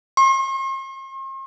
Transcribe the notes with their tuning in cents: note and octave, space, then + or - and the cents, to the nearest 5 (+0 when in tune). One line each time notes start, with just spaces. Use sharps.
C6 +45